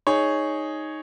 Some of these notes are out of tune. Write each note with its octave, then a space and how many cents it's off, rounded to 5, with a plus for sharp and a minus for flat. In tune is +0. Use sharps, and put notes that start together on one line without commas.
D#4 +0 G#4 +0 C#5 +0